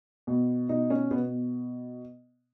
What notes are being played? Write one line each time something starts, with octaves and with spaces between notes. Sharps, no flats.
B2
B2 D#4
C#4
B2 B3